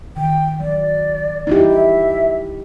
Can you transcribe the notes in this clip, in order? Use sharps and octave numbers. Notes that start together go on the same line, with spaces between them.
D#3 G5
F#3 D5
D#4 E4 G4
E5